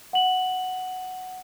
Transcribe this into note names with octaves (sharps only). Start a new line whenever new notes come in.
F#5 F#7